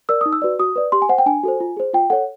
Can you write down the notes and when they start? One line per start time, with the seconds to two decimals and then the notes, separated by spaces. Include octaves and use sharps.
0.09 A#4 D5 E6
0.21 D#4 D#6
0.33 E6
0.42 F#4 B4 D5
0.59 F#4 D#6
0.76 B4 D5
0.92 G4 C6
1.02 G#5
1.09 C5 F#5
1.18 G5
1.26 D4 G#5
1.43 F#4 A4 C5
1.60 F4
1.77 G#4 C5
1.93 F4 G5
2.10 A4 C#5 F#5